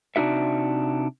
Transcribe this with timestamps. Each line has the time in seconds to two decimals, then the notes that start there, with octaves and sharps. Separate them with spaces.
0.16 C3 D4 D#4 F#4 E5